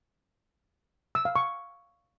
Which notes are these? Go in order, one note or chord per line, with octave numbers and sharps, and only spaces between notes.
E6
F5
C#6